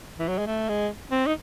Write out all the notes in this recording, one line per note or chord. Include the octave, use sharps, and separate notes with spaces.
E3
F#3
G#3
A3
G#3
C4
D#4